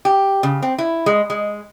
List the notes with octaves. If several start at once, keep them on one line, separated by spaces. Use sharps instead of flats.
G4
C#3
C4
E4
G#3
G#3